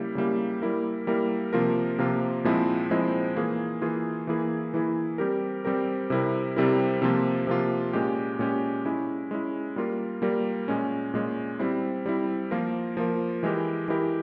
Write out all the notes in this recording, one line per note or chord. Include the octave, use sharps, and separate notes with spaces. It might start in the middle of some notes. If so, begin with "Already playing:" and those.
Already playing: C#3 G3 A#3 E4 G4
C#3 G3 A#3 E4 G4
G3 A#3 E4 A#4
G3 A#3 E4 A#4
C3 F3 A#3 F4 A#4
C3 F3 A#3 F4 A#4
A#2 F3 G#3 C4 E4
A#2 F3 G#3 C4 E4
E3 A#3 F4 G#4
E3 A#3 F4 G#4
E3 A#3 E4 G#4
E3 A#3 E4 G#4
G3 C4 G4 A#4
G3 C4 G4 A#4
C3 G3 C4 E4 A#4
C3 G3 C4 E4 A#4
C3 F3 A#3 F4
C3 F3 A#3 F4
A#2 G#3 C#4 G4
A#2 G#3 C#4 G4
G#3 C#4 E4
G#3 C#4 E4
G3 A#3 F4 A#4
G3 A#3 F4 A#4
A#2 G#3 C#4
A#2 G#3 C#4
G3 C4 E4
G3 C4 E4
F3 A#3 F4 A#4
F3 A#3 F4 A#4
E3 G#3 E4 G4 A#4
E3 G#3 E4 G4 A#4